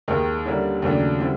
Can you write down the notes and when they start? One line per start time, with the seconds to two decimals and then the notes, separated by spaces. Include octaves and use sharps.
0.08 D#2 D#3 G#3
0.45 D3 G3 A#3 C#4 E4
0.82 D#2 C#3 F#3 A3 D4
1.20 D3 G3 C4 E4